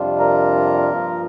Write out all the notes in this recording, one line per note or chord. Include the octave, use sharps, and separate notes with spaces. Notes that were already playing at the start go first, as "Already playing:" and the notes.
Already playing: F2 C3 G3 D4 F4
A#4 A#5
G2 F3 A#3 F4